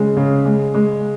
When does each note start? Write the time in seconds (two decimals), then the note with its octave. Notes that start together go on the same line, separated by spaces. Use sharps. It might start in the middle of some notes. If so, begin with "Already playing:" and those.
Already playing: C#3 G#3
0.17 C#3
0.45 G#3
0.75 G#3